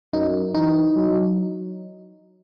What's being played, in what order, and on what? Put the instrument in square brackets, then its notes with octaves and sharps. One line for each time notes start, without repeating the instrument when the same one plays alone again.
[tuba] F#2 [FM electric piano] D#4
[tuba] E3 [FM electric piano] D#4
[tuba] F#3